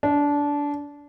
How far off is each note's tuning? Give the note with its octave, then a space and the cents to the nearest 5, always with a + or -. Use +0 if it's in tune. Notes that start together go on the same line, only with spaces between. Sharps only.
D4 -20